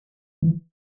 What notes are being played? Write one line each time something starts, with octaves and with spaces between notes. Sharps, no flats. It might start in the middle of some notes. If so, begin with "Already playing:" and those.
E3